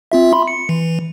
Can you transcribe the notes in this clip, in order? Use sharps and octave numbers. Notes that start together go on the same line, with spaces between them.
C4 F4 E5
B5 C6
C#7
E3